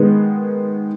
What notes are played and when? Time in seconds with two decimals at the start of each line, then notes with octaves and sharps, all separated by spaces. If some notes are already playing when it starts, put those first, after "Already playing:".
Already playing: D#3 G#3 B3